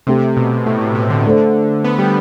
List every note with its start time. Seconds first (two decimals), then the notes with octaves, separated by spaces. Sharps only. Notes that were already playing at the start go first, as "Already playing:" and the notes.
0.07 C3 A3 C4 G4
0.37 B2
0.66 A2
0.81 A2
0.95 C3
1.10 D3
1.25 D3 A3 D4 A4 C5
1.84 B3
1.99 G3